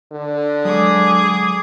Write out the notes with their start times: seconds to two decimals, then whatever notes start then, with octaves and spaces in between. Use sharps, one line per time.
0.12 D3
0.65 F#3 G#3 G#4 D6 D#6